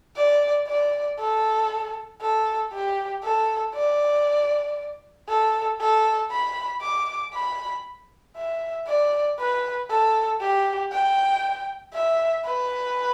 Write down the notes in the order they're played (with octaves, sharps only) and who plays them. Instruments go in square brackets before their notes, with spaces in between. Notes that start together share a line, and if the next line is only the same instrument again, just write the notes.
[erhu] D5
D5
A4
A4
G4
A4
D5
A4
A4
B5
D6
B5
E5
D5
B4
A4
G4
G5
E5
B4